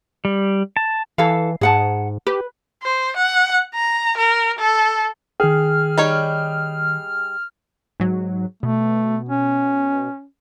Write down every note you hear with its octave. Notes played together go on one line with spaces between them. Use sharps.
G3
A5
E3 E4 A4 F5
G#2 G#4 F#5 A5
G4 B4
C5
F#5
A#5
A#4
A4
D#3 G#4 G5 F6
G3 D#4 C#5
G#2 F#3
B2 A3
C#4